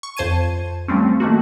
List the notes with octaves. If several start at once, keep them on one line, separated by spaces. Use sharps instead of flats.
C#6
F2 C5 A5 G#6 D#7
F3 G3 A3 C4 C#4
D#3 A3 A#3 F#4